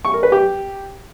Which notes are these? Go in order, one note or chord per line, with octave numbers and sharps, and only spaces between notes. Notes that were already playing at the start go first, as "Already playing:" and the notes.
C#6
A#4
B4
G4